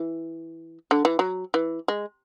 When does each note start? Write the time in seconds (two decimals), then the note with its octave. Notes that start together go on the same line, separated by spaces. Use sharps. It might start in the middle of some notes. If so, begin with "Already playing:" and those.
Already playing: E3
0.91 D3
1.05 E3
1.19 F#3
1.54 E3
1.88 G#3